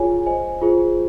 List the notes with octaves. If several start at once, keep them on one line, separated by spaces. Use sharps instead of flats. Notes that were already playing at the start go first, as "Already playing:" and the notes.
Already playing: F4 G#4 C#5 G#5
C5 D#5 G#5
F4 G#4 C5